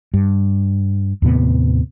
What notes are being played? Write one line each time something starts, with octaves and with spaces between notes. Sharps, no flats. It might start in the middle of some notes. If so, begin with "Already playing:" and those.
G2
D#2 A2 C3 B3